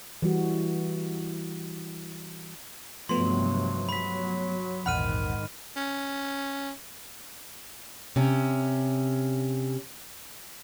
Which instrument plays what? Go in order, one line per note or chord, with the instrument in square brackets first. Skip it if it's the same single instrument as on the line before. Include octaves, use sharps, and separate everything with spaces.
[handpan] E3 G3 F#4
[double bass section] G2 C3 F#3 [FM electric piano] F3 A3 B3 [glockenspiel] C6
[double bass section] F#3 [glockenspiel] B5 B6
[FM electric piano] A#1 E2 F#5 [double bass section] G#2 D#3 [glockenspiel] B5 F6 D#7
[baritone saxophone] C#4
[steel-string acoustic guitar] C3 C#4